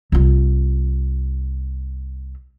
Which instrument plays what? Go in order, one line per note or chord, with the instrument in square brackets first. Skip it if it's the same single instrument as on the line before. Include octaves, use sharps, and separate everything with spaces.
[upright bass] C2 F4